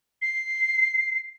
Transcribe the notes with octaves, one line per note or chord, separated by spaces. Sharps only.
C7